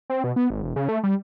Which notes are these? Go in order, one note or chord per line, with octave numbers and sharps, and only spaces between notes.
C4
B2
B3
G#1
E1
C#3
A3
G3